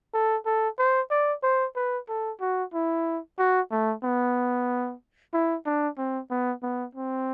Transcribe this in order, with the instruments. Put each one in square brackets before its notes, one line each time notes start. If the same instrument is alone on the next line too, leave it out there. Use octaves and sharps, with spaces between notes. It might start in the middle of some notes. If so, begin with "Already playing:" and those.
[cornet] A4
A4
C5
D5
C5
B4
A4
F#4
E4
F#4
A3
B3
E4
D4
C4
B3
B3
C4